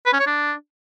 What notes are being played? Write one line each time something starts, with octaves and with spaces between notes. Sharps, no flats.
B4
C#4
C#5
D4